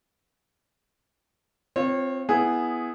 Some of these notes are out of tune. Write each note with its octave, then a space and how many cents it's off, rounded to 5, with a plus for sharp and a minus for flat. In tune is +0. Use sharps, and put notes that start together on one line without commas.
C4 +0 F4 +0 C#5 -30
B3 +0 E4 +0 G#4 +0